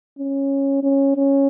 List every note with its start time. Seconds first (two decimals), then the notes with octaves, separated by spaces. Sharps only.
0.19 C#4
0.83 C#4
1.16 C#4